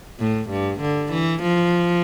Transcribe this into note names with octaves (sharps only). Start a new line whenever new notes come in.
A2
G2
D3
E3
F3